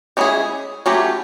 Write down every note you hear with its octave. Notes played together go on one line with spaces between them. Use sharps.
G#3 C#4 E4 G#4
F#3 A3 C#4 E4 G4